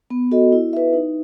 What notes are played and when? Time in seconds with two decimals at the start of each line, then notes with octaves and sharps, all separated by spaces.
0.10 B3
0.31 F#4 A4 D#5
0.52 E4
0.73 B4 E5
0.93 D#4